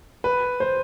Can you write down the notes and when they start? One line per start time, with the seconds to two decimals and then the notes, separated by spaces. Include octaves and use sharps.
0.24 B4
0.60 C5